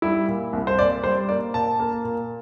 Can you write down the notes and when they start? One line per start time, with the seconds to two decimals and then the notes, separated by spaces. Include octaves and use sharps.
0.02 G3 E4
0.28 A#2
0.53 C2
0.67 C5
0.78 A#2 D5
1.04 G3 C5
1.29 A#3 D5
1.54 A#2 A5
1.79 A#3
2.04 A#2